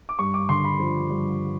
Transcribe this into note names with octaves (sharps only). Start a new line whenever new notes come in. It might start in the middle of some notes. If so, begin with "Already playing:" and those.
D6
G2 C#6
D6
D3 C6
B5
F3
G2